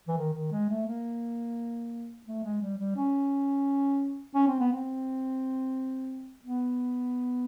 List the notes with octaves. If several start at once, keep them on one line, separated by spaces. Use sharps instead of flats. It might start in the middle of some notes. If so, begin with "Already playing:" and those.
E3
D#3
D#3
G#3
A3
A#3
A3
G#3
G3
G3
C#4
C#4
C4
B3
C4
B3